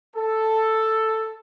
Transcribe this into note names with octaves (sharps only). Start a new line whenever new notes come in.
A4